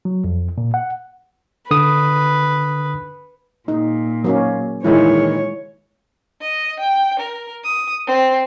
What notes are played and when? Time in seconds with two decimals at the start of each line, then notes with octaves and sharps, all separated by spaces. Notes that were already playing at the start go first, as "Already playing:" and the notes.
0.05 F#3
0.24 F2
0.58 A#2
0.74 F#5
1.71 D3 B4 D#6
3.68 A#2 D#4
4.24 F#3 A#3 C#4
4.84 A#2 D#3 E3 G#3 E4 C#5
6.41 D#5
6.80 G5
7.20 A#4
7.64 D#6
8.07 C4